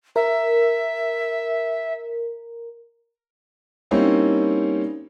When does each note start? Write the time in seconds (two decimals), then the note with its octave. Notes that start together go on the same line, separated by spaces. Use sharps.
0.16 A#4 E5
3.91 G3 A#3 C4 C#4 D#4 E4